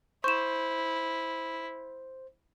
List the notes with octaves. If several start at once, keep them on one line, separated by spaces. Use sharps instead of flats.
E4 C5 C#6 E7